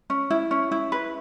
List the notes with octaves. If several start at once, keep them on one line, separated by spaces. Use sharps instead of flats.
C#4
E4
C#4
E4
B4